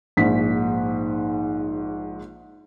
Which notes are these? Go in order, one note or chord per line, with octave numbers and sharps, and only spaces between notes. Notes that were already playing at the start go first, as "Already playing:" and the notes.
A#1 G#2 B6